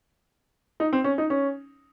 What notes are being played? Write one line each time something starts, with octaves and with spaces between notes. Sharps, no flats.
D#4
C4
C#4
D#4
C#4